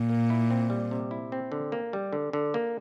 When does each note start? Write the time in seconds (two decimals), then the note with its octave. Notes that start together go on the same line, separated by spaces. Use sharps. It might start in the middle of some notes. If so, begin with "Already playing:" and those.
Already playing: A#2
0.09 A#3
0.30 E4
0.50 C4
0.70 G3
0.91 C3
1.11 E4
1.32 C4
1.52 D3
1.72 A#3
1.93 G3
2.13 D3
2.33 D3
2.54 A#3